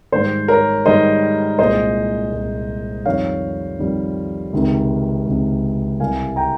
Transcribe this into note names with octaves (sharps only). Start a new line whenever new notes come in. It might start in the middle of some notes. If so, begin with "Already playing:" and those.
G#2 D#3 G3 C5
A#4 C#5
G#2 D#3 G3 C5 D#5
C2 A#2 G#3 C5 D#5
C2 A#2 G#3
F2 D#3 G3 C#5 F5
F2 D#3 G3
C#2 C3 D#3
C#2 C3 D#3
C2 C3 G3 F5 G#5
G5 A#5